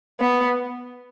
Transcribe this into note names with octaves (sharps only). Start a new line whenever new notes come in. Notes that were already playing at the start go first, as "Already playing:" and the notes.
B3